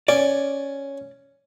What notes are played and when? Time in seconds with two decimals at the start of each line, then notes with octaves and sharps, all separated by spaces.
0.08 C#4 D5